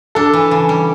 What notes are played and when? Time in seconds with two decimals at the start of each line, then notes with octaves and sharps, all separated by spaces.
0.15 D4 A4
0.33 E3
0.51 C#3
0.69 G3